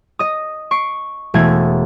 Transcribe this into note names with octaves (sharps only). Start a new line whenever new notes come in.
D#5 D#6
C#6 C7 D7
E1 A3 G#6